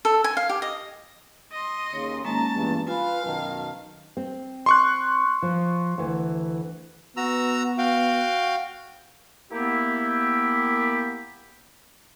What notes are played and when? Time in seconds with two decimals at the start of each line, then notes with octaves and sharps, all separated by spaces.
0.05 A4
0.24 G#5
0.37 F5
0.49 G4
0.62 D#5
1.52 D#5 C6
1.93 D#2 C#3 C#5
2.25 G#1 G#3 A#3 C#4 D#4 A5 A#5
2.55 E2 G2
2.87 F4 B4 F5 G#5
3.26 F#2 B2 D#3 A5
4.17 C4
4.66 C6 C#6 F#6
5.42 F3
5.98 D2 E3
7.17 B3 F#4 A#5 E6
7.78 F#4 F5 G5
9.52 A#3 B3 E4 G4